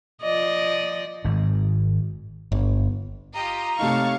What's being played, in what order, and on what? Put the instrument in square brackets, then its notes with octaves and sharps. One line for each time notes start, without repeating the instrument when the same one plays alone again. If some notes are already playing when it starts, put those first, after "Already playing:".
[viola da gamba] F3 D5 D#5
[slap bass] G#1 G#2
[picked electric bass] G1
[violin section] F4 G4 D#5 [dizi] A#5
[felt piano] C3 A3 D#4 [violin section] C#5 A5 C#6 [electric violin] F5